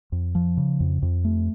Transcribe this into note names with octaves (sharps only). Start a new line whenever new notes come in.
F2
F3
C#3
F2
F2
A3